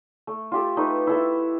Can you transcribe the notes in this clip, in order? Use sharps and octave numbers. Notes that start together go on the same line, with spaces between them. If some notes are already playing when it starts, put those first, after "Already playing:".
A3
F4 G4 A4
A3 D#4 B4
E4 A4 E5